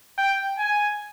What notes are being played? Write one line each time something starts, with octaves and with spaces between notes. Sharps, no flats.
G5
G#5